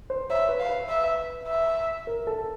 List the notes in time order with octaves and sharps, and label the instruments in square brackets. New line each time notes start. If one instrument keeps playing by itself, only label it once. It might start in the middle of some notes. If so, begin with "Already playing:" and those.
[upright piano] C5
[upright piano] C#5 [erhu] E5
[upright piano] B4
[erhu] F5
[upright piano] B4
[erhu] E5
E5
[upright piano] A#4
A4